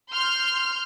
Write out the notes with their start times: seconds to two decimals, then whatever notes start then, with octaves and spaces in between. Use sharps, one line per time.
0.10 C6 F6 G6